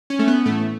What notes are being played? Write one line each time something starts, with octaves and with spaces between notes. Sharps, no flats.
C#4
A3
B3
A2 E3 A3